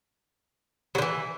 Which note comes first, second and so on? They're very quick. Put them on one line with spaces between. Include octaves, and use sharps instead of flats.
F#3 D3 E3